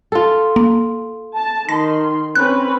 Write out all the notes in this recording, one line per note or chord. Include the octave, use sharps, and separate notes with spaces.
F4 A4
A#3
A5
D#3 C6 A#6
C4 C#4 B4 F#6